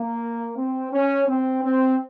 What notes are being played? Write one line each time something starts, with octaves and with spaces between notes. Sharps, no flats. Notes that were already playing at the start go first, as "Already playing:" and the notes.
Already playing: A#3
C4
C#4
C4
C4